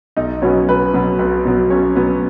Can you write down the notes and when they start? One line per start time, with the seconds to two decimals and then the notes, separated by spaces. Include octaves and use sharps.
0.17 B1 D#4 D#5
0.42 B2 F#3 B3 C#4 C#5
0.69 B1 B4
0.94 B2 F#3 B3
1.19 B1 B4
1.45 B2 F#3 B3
1.70 B1 C#4 C#5
1.95 B2 F#3 B3